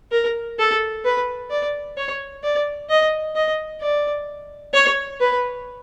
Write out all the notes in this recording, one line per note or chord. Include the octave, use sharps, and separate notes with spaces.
A#4
A4
B4
D5
C#5
D5
D#5
D#5
D5
C#5
B4